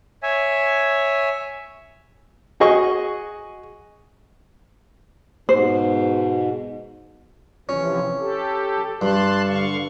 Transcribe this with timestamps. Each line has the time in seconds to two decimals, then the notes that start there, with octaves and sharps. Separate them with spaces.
0.23 C#5 E5 G#5
2.60 F#4 G#4 D#5 C#6
5.49 G#2 B2 C5
7.69 C3 E3 F3 C#4
8.19 G4 A4
9.01 G2 A5 C6 F#6
9.46 D3 F5 C#6